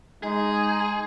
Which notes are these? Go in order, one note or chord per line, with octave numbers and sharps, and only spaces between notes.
G#3 D#4 G#4